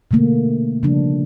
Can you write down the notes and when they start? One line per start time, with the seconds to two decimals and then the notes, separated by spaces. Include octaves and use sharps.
0.11 B2 D3 A3 A#3
0.83 C#3 F3 G3 D4